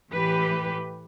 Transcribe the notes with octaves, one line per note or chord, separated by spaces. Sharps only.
A2 E3 G4 B4